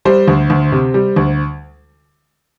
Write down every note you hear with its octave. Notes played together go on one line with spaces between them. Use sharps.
G3 C5
D2
D2
C3
G3
D2